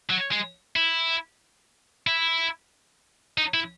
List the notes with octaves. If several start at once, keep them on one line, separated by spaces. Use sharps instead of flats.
F#3
G#3
E4
E4
D#4
E4